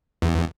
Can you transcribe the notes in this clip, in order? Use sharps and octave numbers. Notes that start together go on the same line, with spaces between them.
E2